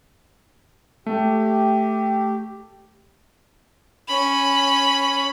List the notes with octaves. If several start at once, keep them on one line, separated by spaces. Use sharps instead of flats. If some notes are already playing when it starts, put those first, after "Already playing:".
A3 G4
C#4 B5